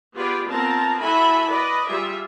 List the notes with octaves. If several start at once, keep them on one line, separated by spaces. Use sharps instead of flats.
B3 F4 G4 G#4 B4 D5
B3 C4 F4 A#4 A5 A#5
E4 F#4 A4 E5 G#5 B5
B4 D5 D#5
G3 F4 G#4 E5